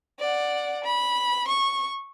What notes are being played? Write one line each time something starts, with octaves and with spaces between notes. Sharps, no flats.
D5 F#5
B5
C#6